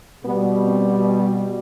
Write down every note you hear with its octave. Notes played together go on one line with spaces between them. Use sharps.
B2 G3 B3
C4